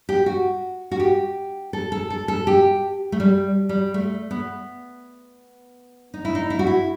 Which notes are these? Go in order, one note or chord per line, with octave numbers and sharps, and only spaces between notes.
G4
F#4
F#4
G4
A4
A4
A4
A4
G4
A3
G3
G3
A3
B3
D#4
E4
D#4
E4
F#4
E4